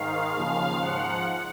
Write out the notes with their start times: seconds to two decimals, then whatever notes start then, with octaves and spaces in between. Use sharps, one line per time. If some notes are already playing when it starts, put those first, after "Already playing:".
Already playing: G#2 D#3 F5
0.36 D#2 C#3 F3
0.82 G#2 F3 F#5